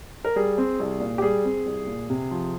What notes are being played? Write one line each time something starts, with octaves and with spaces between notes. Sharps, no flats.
A#4
G3 G#4
C4
C2
A#2
G4
G3 G#4
C4
C2
A#2
C3
F3